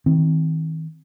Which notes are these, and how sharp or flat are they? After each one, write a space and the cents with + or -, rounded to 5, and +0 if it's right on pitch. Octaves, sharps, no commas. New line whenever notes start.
D#3 +40 C4 +0